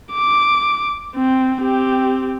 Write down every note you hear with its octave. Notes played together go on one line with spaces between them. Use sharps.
D6
C4
C4 G4